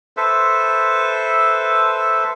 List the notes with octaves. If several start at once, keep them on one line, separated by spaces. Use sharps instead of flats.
A4 B4 C5 E5